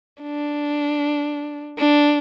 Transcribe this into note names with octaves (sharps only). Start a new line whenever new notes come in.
D4
D4